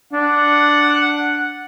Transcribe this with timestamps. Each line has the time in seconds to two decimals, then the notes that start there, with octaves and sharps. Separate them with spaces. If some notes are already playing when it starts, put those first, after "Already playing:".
0.13 D4 F#5